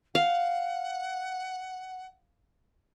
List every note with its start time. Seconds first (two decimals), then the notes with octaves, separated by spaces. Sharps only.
0.15 F5 F#5